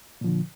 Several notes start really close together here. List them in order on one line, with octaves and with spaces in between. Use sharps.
A#2 F3 D3